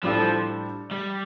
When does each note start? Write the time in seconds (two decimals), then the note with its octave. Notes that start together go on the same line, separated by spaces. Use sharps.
0.03 A2 F3 G3 D4 F4 A4
0.91 G3